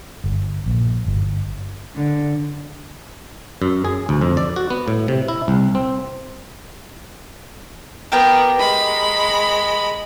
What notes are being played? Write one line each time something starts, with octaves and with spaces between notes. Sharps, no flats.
G1
A#1
G1
D3
F#2
G#4
D2
F2
D5
F#4
B3
A2
C3
E4
C2
C4
B3 G4 A#4 G5
G#3 B5